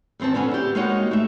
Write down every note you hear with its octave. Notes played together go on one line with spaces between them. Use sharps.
E2 D#3 C4 C#4 A5
D3 B3 C#4 G#5
E4 G4
G#3 A#3 D#4 F#4 C#5 F#5
A3 E5